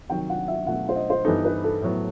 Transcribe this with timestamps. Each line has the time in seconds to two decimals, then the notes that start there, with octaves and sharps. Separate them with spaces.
0.10 C3 D#3 F#3 G5
0.30 F#5
0.48 E5
0.67 B2 F#3 A3 F#5
0.89 C5
0.96 D#5
1.10 C5
1.24 G2 E3 B3 D#4 A4
1.45 B4
1.64 A4
1.82 A2 F#3 B3